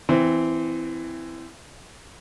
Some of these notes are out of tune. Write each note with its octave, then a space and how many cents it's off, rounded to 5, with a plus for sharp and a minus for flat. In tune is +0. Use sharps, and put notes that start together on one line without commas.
E3 +0 C4 -15